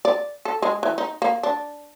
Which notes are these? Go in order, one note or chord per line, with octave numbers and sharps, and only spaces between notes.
D5
A4
G#3
E3
D#4
A#3
D4